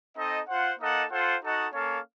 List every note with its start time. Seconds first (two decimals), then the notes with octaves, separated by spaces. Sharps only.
0.17 C4 D#4 A4 D#5
0.48 F4 C5 F#5
0.79 A#3 D#4 A4 D#5 F#5
1.10 F4 A4 C5 F#5
1.42 D#4 F#4 A4 D#5 F#5
1.73 A#3 C#4 A4 C#5 F5